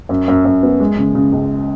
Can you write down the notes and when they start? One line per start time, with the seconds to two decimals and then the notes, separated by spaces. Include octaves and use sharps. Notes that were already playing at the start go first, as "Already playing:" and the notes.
0.09 F#2
0.28 F#2
0.45 F#2
0.63 B3
0.80 G#3
0.97 C#3
1.15 C#3
1.32 C#2